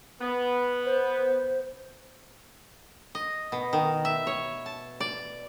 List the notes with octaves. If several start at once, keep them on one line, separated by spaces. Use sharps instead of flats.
B3
C5
D#5
B2
D#3
E5
C#5
A5
D5